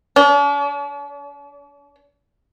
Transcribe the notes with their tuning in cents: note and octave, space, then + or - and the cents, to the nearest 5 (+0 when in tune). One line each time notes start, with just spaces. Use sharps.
D4 -45